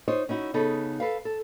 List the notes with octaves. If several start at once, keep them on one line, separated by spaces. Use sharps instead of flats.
D#4 F4 C5 C#5 D#5
C#4 D#4 E4 F#4
C#3 B3 D#4 G#4 A4
A4 B4 F5
A4